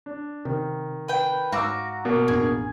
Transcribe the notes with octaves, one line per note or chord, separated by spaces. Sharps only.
D4
C3 D#3
B4 G5
G#2 F#4 F5 A#5 D6 E6
B2 A#3
A1 F2 D4 G#4